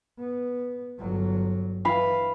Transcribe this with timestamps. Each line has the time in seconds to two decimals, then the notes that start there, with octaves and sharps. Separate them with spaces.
0.19 B3
0.98 G1 F#3
1.85 E3 F5 B5